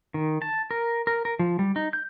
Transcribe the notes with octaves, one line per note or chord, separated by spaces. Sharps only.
D#3
A5
A#4
A#4
A#4
F3
G3
D#4
G6